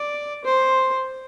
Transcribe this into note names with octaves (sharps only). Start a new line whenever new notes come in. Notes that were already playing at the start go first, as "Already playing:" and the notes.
Already playing: D5
C5